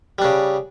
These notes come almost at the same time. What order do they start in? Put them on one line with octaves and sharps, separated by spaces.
G3 D4 C#3